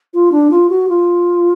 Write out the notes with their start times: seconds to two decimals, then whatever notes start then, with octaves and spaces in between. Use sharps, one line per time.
0.14 F4
0.32 D4
0.51 F4
0.69 F#4
0.89 F4